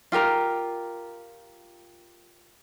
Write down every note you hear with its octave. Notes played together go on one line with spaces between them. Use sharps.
F4 G4 A#4 A#5